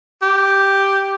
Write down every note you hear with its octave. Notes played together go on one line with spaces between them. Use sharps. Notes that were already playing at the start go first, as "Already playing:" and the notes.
G4